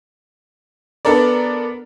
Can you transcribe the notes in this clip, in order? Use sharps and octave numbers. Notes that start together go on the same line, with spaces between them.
B3 D4 A4 A#4 D5